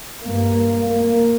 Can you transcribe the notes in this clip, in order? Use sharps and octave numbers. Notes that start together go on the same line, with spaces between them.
G2 A#3
A#3